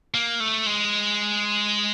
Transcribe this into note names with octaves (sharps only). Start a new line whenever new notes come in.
A#3
A3
G#3